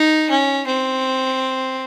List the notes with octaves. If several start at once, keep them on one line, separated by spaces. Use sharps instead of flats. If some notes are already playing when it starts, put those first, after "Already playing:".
Already playing: D#4
C#4
C4